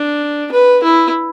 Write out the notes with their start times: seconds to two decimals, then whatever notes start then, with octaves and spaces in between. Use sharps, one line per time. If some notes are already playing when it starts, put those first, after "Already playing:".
Already playing: D4
0.52 B4
0.83 E4